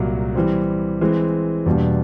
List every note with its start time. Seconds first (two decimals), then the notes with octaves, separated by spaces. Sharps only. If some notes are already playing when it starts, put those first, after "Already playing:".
Already playing: C2 A#2 F#3 A#3
0.35 E3 G3 C4
1.01 E3 G#3 C4
1.66 E2 B2 G3 A#3 D4